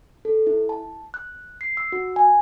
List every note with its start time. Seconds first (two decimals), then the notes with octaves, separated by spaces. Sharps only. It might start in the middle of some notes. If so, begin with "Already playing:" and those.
0.25 A4
0.47 E4
0.69 A5
1.14 F#6
1.61 C7
1.77 E6
1.92 F#4
2.16 G#5